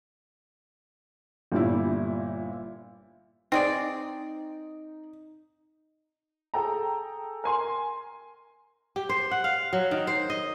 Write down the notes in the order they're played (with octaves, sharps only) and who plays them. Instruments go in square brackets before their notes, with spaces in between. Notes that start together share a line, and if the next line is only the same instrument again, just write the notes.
[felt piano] G1 A#2 G3 E4
[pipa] C4 G#4 D5 [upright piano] D#4
[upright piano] G#4 A4 G5 A#5
A#4 G#5 C6
[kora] G4
C5
F#5
F5
F#3
D#3
C5
D#5